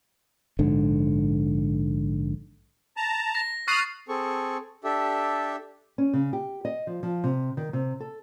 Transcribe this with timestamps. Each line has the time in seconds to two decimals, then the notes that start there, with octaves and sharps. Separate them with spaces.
0.59 A#1 G#2 D3
2.97 A5 A#5
3.35 A#6
3.68 C#6 D#6 F6 F#6 A6 C7
4.09 C4 G#4 A4 C#6
4.84 D4 G4 A4 E5
5.98 C#4
6.13 C#3
6.33 G4
6.65 D#5
6.87 F3
7.03 F3
7.24 C3
7.57 D#3
7.73 C3
8.00 A4